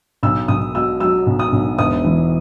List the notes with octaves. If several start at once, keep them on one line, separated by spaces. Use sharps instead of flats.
B1 E6
B1 D#6
B2 E6
F#3 E6
B1
D#6
B1
E1 D#6
E3